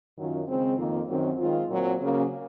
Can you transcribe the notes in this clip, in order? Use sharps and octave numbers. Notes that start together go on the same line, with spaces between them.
F#2 D#3 F#3 C#4 F4
C#3 G#3 C4
F2 D#3 A#3 F4
F#2 D#3 F#3 C4
D#3 G#3 C4 F4
A#2 F#3 C4
C#3 F#3 A#3 C#4